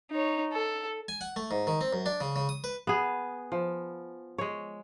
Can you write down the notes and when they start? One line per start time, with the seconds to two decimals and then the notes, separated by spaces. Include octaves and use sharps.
0.11 D#4 C#5
0.53 A4
1.08 G#5
1.21 F#5
1.36 A3
1.51 G#2
1.67 D#3
1.81 C4
1.93 F#2
2.06 D4
2.21 C#3
2.36 C#3
2.49 D#6
2.64 B4
2.87 B3 G#4
3.52 F3
4.38 G#3 C#5